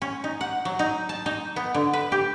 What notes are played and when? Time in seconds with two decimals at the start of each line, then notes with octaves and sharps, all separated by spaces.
0.02 C#4
0.24 D#4
0.41 F#5
0.65 F#3
0.79 D#4
1.09 A5
1.26 D#4
1.56 B3
1.75 D3
1.93 B4
2.12 G4